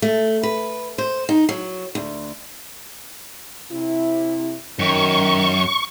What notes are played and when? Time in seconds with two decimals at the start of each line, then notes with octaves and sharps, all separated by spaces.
0.02 A3
0.43 B4
0.98 C5
1.29 D#4
1.49 F#3
1.95 D2
3.72 C3 E4
4.79 F#2 D#3 C#6